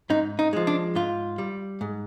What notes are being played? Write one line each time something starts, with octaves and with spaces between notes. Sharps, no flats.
G#2 D#4
D#4
F3 G#3
D4
G#2 F4
G3
G#2